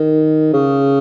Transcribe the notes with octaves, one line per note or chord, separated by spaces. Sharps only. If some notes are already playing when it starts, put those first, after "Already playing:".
Already playing: D#3
C#3